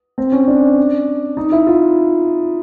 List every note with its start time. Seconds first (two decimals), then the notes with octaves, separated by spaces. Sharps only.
0.18 C4
0.32 C#4
0.47 D4
1.37 D#4
1.52 E4
1.67 F4